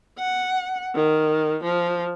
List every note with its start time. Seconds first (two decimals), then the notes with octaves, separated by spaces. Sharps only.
0.19 F#5
0.95 D#3
1.64 F3